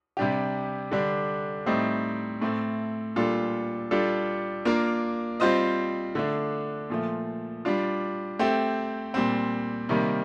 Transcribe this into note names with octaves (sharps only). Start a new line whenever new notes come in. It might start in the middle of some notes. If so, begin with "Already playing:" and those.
C3 G3 D4 G4
D3 G3 D4
A2 G3 C4 D#4
A2 A3 C4
A#2 G3 D4 F4 A4
G3 D4 F4 A4
A#3 D4 F4 A#4
G3 C4 F4 C5 D#5
D3 A3 D4
A#2 F3 A3
G3 D4 F4
A3 C4 G4
A#2 G3 C4
C3 D#3 G3 A#3